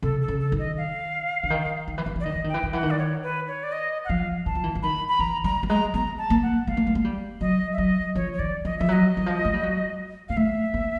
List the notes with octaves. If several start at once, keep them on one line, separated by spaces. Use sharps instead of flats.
C3 A4
A4
C#3
A4
D#3
D#5
F5
D3
D#3
D#3
E3
D#3
E3 D5
D#3 D#5
E3
D#3 G5
E3
D#3
E3 F#5
D#3
D5
C#5
B4
C#5
D5
D#5
F#5
F3 F5
E3 A5
F3
E3
E3
D#3 B5
B5
E3 A#5
G3 A#5
G3
G#3 A#5
B3 A#5
A5
A#3
F#5
G#3 F5
A#3
A3
G#3
G3
F#3 D#5
E5
F#3 D#5
F3 C#5
C#5
D#3 D5
F3 D#5
F3 E5
F#3 D#5
E3
F3
G#3
G3
F#3
A#3 F5
A3 E5
A#3